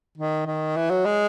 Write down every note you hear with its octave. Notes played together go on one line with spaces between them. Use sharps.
D#3
D#3
E3
F#3
G#3